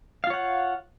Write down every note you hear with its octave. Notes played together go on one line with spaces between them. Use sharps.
F4 C#5 F5 F#5